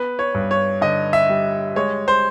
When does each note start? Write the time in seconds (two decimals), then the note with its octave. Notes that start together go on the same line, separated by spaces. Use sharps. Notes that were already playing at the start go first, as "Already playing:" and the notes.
Already playing: B3 B4
0.19 C#5
0.35 G2
0.51 C#5
0.81 D3 D#5
1.13 E5
1.29 G3
1.76 G#3 C#5
2.08 C5